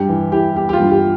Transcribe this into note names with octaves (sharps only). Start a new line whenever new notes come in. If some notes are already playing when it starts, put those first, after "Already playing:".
Already playing: G2 G4
E3
E4 G4
B3 G4
G4
F4
G2
G4